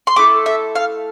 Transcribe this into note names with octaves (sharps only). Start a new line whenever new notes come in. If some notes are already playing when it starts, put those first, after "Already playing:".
C6
A3 E4 A4 D6
E5
F5